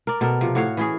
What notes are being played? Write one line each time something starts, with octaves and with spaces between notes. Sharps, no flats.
A#4 D5
B2 A4 A#4
C3 F3
A2 F#4 C#5 F5
E3 C#4 G#4